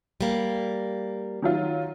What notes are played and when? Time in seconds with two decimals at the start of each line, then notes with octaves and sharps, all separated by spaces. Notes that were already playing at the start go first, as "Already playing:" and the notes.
0.21 G3 A#3
1.42 D#3 F#3 F4